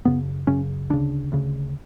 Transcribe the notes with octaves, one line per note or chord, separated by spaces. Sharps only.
F#1 F#2 C#3 B3
F#1 F#2 C#3 C#4
D2 C#3 D4
D2 C#3